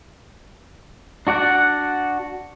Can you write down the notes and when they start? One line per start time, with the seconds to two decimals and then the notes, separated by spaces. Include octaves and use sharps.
1.27 D4 F#4 D5 F#5